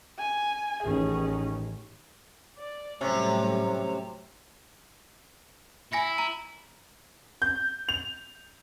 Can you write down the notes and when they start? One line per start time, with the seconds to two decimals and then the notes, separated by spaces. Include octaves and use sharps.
0.18 G#5
0.83 A1 D#3 C#4 G#4
2.58 D5
3.01 A2 C3 F#3 G3 C#4
5.93 E4 G#5 A#6 C#7
6.18 A#5
7.42 G6
7.89 F7